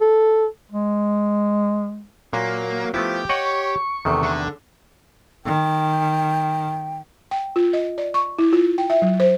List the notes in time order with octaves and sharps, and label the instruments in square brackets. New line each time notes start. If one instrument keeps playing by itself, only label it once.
[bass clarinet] A4
G#3
[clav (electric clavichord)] A#2 [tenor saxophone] F#3 [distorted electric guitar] A#3
[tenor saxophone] F3 [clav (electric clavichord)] A3 B3 E4 [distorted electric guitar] G4
[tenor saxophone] C#5 [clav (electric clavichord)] D#5 F#5 G5 [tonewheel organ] C#6
[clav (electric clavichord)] E2 C3 D#3 [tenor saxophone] A3
[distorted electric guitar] D3
[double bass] D#3 [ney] G5
[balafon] G5
F4
D#5
D5
C#6
E4
F4
G5
E5
F#3
C5